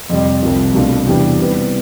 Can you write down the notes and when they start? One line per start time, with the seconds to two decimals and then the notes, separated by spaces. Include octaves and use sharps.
0.10 F2 C3 G3
0.43 C2 C3 F3
0.74 C2 B2 A3 D4 F4
1.06 E2 C3 E3 G3 D4
1.39 C3 G3 B3 E4